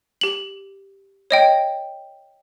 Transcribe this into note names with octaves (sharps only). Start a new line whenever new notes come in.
G4 F#7
C#5 D#5 G5